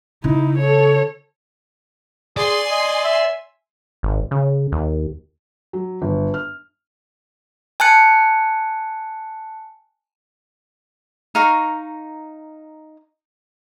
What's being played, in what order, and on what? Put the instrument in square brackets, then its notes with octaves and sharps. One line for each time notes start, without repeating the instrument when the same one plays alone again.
[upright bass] C#3 [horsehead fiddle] D#4 E4
[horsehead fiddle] A4 C#5
[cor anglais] G#4 [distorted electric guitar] D5 [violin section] G#5 C6
[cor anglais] D#5
E5
[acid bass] G#1
C#3
D#2
[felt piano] F#3
G1
F6
[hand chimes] G#5 A5 F#6 C#7
[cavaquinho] D#4 F5 A#5 C#6